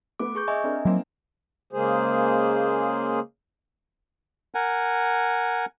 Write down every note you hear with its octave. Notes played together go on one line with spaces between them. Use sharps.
A3 B3 D6
G#4 C#6 G6
D#5 E5 G#5 C#6
C4 D4 A#4
F#3 A#3 C4 D#4
C#3 G#3 A#3 G#4 C5
A#4 F#5 G#5